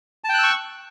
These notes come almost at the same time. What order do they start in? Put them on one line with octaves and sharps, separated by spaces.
A5 G5 F#6 E6 C#6